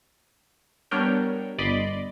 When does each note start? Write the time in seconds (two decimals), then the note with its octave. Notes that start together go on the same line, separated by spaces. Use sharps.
0.91 G3 B3 D4 A#4 C#5 G5
1.58 G1 D5 D#5 B5 C6 D6